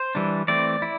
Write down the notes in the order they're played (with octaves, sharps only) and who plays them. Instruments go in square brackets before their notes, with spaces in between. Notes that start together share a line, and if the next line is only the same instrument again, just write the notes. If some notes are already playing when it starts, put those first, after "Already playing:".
Already playing: [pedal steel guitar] C5
E3 G3 D4
E3 A3 C4 D5
E4